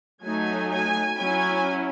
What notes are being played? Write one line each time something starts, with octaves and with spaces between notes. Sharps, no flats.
F#3 A3 D#4 G#5
G#5
F#3 C#4 E4 G#5